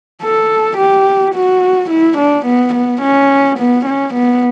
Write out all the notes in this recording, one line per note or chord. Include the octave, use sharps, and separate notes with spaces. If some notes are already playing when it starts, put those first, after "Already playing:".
A4
G4
F#4
E4
D4
B3
B3
C#4
B3
C#4
B3